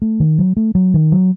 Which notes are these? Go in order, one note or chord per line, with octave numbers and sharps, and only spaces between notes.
A3
D#3
F#3
A3
F#3
D#3
F#3